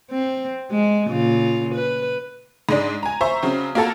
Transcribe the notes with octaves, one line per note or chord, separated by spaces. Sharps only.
C4
G#3
A#2 C#3 F4
B4
G#2 G#3 D4
G#5 A#5
C5 E5 A#5 C#6
C#3 F#3 C4
A#3 F4 F#4 A4 A5 A#5